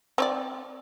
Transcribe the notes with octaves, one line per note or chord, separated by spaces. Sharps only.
C4 C#5 D5